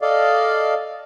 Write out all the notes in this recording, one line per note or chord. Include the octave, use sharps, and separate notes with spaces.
A4 D5 D#5 F5